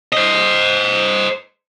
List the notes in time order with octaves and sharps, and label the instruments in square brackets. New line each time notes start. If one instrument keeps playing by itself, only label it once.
[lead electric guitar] C5 D#5